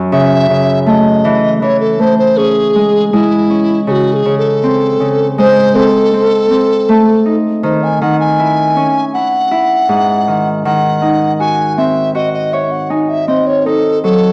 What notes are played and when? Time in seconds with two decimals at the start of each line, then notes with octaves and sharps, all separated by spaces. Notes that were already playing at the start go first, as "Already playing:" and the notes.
Already playing: F#2
0.12 C#3 E5
0.50 C#3
0.86 A3 D#5 E5
1.25 E3
1.62 E3 C#5
1.80 A4
1.99 A3 C5
2.19 C5
2.37 C#4 G#4
2.75 G#3
3.13 G#3 E4
3.50 C#4
3.87 C#3 G#4
3.91 F#4
4.13 A4
4.16 G#4
4.26 C#3
4.38 A4
4.64 C4
5.00 C#3
5.38 G#3 C5
5.75 C4 A4
6.14 C4
6.51 C4
6.89 A3
7.26 D#4
7.63 D#3 C5
7.83 G#5
8.02 D#3 F#5
8.20 G#5
8.40 E4
8.76 C#4
9.14 E4 F#5
9.51 E4
9.89 G#2
10.28 D#3
10.65 D#3 F#5
11.02 D#4
11.39 F#4 G#5
11.77 C4 E5
12.15 F#4 D#5
12.34 D#5
12.53 C#5 E5
12.72 F#5
12.90 D#4 G#5
13.09 E5
13.28 C4 D#5
13.47 C#5
13.66 D#4 A4
14.03 F#3 A4